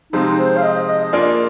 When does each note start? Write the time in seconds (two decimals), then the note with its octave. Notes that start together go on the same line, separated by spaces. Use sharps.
0.13 C3 F3 G#3 C4 D#4
0.38 C5
0.57 F5
0.63 D#5
0.88 D#5
1.13 A#3 D4 F4 G#4